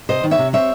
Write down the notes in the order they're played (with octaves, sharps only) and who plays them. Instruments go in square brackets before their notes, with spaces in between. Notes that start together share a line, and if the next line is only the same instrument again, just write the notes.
[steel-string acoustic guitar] C3 C5 D#5
D#3
C#5 E5
C3
C4 C#5 E5